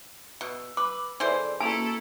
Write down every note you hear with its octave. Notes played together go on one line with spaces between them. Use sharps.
B2 E6
B4 D6
B2 E3 G#4 A4 C5 D5
A#3 C#4 E4 F#4 A4 A5